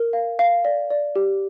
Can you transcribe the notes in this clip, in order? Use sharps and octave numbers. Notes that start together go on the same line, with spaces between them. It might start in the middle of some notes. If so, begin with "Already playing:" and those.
Already playing: A#4
F5
F5
D5
D5
G4